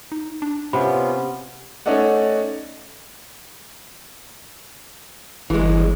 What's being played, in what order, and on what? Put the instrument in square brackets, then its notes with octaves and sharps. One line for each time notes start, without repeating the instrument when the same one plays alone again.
[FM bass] D#4
D4
[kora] C3 [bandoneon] B3 C#4 F4 [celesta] F#5 B5
[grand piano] A3 C#4 D#4 A4 D5 F#5
[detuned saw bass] G1 [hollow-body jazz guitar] E3 G#3